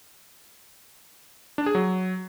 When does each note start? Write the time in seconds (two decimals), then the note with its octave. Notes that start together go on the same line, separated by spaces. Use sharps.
1.58 D4
1.66 G#4
1.75 F#3